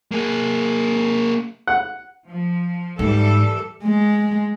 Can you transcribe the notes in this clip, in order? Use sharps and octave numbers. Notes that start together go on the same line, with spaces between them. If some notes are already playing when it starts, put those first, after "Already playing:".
A#3 G#4
F#5
F3
G#2 E3 G3 A4
G#3